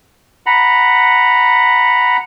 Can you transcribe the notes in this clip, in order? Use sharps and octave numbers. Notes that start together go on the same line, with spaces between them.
F#5 A#5 B5